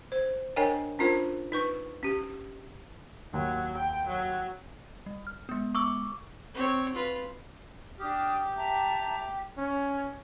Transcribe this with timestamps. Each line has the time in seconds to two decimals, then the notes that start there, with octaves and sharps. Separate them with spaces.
0.12 C5
0.56 D4 A#4 C#5 D#5 G5 G#5
0.99 C#4 D4 F4 A#4 C5
1.52 D#4 B4 C#6
2.03 C#4 G4
3.34 D#2 F#3
3.77 G5
4.07 F#3
5.06 G3
5.27 F6
5.49 G#3 B3
5.75 C#6 D6 E6
6.55 C4 C#5
6.95 F4 B4
7.99 D4 G4 D#6 F6
8.56 E5 A5 A#5
9.58 C#4 C#5